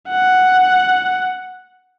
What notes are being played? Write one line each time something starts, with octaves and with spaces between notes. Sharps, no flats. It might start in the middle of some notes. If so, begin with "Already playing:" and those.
F#5